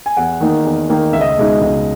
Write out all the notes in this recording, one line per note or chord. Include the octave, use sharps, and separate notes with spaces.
G#5
E2 F#5
D#3 A#3 D#4
E2
D#3 A#3 D#4
C#2 E5
D#5
E5
B2 G#3 D#4
C#2